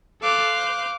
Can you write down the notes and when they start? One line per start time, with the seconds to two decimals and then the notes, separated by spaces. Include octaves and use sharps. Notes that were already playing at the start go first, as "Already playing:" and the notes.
0.22 A4 C5 F5 D6 F#6
0.55 D6